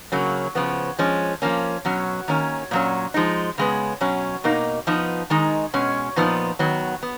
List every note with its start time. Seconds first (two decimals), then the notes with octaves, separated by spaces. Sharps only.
0.12 C#3 F#3 A#3
0.55 C#3 F3 B3
0.99 F3 G#3 C#4
1.42 F3 A#3 C#4
1.85 B2 F#3 C#4
2.28 D#3 A#3 C#4
2.71 A#2 F#3 C#4
3.14 F3 G#3 D#4
3.58 C#3 G#3 B3
4.01 B2 F#3 C#4
4.44 B2 A#3 D#4
4.87 F3 B3 D#4
5.30 D#3 G#3 D#4
5.74 B2 G#3 C#4
6.16 A#2 F3 B3 D#4
6.59 D#3 F#3 B3
7.03 B3